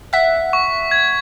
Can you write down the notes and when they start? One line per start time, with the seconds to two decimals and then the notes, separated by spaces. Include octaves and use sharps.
0.13 E5 F#5 B6
0.53 C#6
0.91 G#6